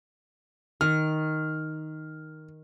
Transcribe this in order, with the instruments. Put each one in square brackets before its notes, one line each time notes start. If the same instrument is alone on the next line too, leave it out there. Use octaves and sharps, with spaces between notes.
[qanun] D#3 [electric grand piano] F6